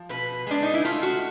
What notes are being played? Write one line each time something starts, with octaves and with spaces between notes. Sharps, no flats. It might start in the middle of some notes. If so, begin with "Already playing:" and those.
Already playing: F3
B2 B4
G#3 D4
D#4
E4
A3 F4
F#4